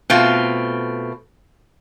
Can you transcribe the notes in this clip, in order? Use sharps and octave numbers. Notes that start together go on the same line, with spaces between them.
B2 A3 C4 F4